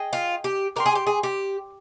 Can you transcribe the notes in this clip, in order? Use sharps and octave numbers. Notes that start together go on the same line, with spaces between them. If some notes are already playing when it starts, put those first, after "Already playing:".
Already playing: G#4 D#5 G5
F4
G4
A#4 D5 G5 C6
G#4
G4
G#4
G4